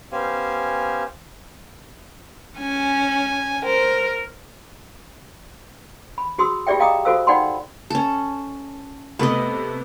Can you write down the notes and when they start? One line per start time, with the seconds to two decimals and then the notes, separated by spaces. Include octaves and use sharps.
0.12 B3 C#4 G4 C5 F5 G#5
2.59 C#4 G#5
3.65 A#4 C5
6.18 B5
6.38 F#4 G#4 C6 D#6 E6
6.67 F4 G4 G#4 D5 E5 G5
6.80 D#5 F5 G5 A#5 D6 D#6
7.05 F4 F#4 A4 C5 F5 E6
7.27 D#4 D5 F#5 G5 B5 C6
7.90 C#4 A4
9.19 C3 A3 B3 B4 D#5